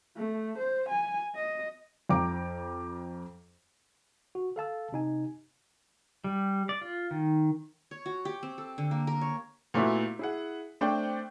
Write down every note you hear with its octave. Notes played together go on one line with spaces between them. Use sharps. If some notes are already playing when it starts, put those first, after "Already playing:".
A3
C5
G#5
D#5
F2 G5 A#5 D6 D7
F#4
A4 F5 A5 E6
C3 D#4 G#5
G3
D5
F4
D#3
C#5
F#4
G4
C4
A4
D3
A#3
A#4
C#5
A#2 A3 B3 E4 F#4
E4 G#4 F#5
A3 C4 D4 C5 D5 G5